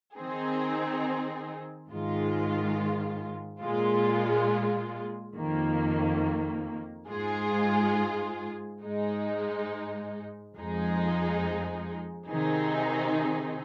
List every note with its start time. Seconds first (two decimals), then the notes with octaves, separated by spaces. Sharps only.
0.15 D#3 C4 D#4 G#4
1.89 G#2 D#3 G#3 F4
3.62 A#2 G#3 F4
5.36 F2 D#3 A#3
7.08 G#2 G#3 F4 G#4
8.83 G#2 G#3 D#4
10.55 F2 F3 G#3 D#4 G#4
12.28 C3 D#3 C4 D#4 G#4